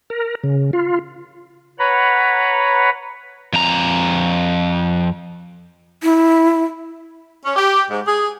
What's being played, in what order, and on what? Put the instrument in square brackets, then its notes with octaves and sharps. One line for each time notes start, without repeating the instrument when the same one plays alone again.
[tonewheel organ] A#4
C#3
F4
[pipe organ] B4 C#5 F#5 A#5 B5
[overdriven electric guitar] F2 A#5
[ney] E4
[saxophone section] C#4
G4
G#2
G#4